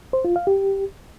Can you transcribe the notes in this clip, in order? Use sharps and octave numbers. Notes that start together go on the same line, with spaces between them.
C5
F4
F5
G4